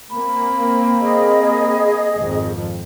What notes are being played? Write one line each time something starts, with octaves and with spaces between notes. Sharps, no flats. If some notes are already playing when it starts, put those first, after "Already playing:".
A#3 C4 B5
G#4 D#5
G#1 F2